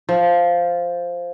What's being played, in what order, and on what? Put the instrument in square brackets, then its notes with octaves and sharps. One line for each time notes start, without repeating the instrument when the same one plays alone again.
[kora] F3